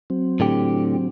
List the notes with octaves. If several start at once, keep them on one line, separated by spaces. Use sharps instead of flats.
F#3 C4
A2 D3 G4